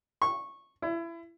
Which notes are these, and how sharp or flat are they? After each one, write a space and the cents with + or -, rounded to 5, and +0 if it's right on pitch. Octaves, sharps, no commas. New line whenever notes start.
C#6 -15
E4 +25